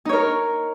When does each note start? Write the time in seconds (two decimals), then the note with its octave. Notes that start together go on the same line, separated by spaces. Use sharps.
0.05 D#4
0.09 C#5
0.13 A#4